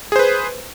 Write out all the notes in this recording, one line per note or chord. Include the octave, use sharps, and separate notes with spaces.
G#4 B4 C5